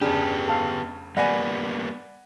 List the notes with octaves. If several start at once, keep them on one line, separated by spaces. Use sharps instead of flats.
F1 C#3 B3 D4 G4 G#4
A4 F5
G3 A#3 B3 D5 F#5 G#5 B5 A#6